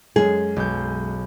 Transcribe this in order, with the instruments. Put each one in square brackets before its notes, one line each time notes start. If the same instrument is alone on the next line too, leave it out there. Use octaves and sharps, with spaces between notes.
[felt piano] F#2 G#3 C#4 [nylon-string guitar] G#4
[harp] B1 G6